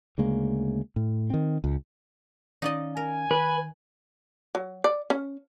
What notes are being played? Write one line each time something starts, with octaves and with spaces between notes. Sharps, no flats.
D2 C#3 G#3 A#3
A2
D#3 C4
C#2
D#3 C#4 D#4 D5 D#5 F5
A#4 G#5
D#3 B4
F#3
D5
C#4